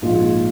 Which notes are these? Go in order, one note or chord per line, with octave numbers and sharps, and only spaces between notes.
A#1 G#2 G#3 F4